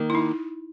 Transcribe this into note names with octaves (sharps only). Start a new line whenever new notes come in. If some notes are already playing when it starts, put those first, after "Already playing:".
Already playing: D#3 A#3
E4
D#4